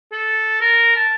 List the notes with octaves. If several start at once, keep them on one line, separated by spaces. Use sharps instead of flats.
A4
A#4
A5